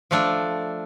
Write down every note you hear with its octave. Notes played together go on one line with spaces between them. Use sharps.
F3 A3 D4 A4